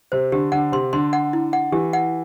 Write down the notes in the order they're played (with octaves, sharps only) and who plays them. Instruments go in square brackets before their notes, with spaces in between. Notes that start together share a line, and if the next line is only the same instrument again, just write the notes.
[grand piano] C3 [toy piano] C5
[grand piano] D3 [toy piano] G4
[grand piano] D3 [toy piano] F#5
[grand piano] C3 [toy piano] C6
[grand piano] D3 [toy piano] C6
[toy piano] F#5
E4
F#5
[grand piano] E3 [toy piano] G4
[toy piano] F#5